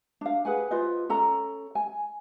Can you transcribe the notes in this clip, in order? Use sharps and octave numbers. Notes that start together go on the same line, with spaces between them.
D4 F5
G#4 B4 F#5 G#5
F4 B4 C5 D#5
C#4 A4 A#5
G#5